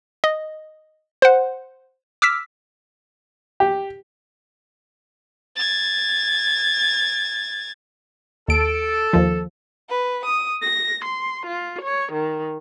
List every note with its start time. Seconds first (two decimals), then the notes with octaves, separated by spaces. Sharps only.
0.24 D#5
1.22 C5 F#5
2.22 D6 E6 F6 B6
3.60 G4
5.56 G#6 A6
8.48 D#2 A4 D7
9.13 D#2 F3
9.90 B4
10.26 D#6
10.62 A#6
11.06 C6
11.48 F4
11.83 C#5
12.13 D#3